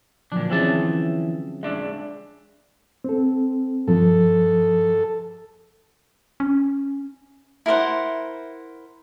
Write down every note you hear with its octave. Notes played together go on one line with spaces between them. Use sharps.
A#2 D3 F3 F#3 D4
E3 C4 C#4 G#4 E5 A5
G#3 D4 E5
C4 A4
G2 F3 A4
C#4
E4 A#4 C5 F#5